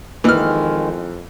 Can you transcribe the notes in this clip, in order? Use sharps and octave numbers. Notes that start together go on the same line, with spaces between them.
F2 A#2 D#3 E3 G#3 D#4 F6